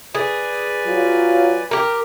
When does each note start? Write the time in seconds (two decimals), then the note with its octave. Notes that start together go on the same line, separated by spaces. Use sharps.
0.15 G#4 B4 D5 G#5
0.85 F#3 F4
1.71 G4 A#4